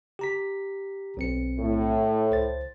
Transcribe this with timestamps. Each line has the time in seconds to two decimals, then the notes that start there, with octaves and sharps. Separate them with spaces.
0.19 G4 A#5 B6
1.17 B1 C4 C#7
1.58 A2
2.31 C#2 C5 A6